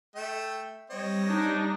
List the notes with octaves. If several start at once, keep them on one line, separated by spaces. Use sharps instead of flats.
A3 E5 G5
G3 C4 C#5 D#5 A#6
D4 D#4